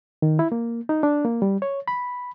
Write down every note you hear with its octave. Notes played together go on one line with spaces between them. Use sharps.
D#3
E4
A#3
D#4
D4
A#3
G3
C#5
B5